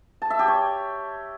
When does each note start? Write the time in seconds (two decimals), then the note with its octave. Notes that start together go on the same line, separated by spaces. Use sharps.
0.22 A5
0.30 E5
0.39 G4
0.48 C#5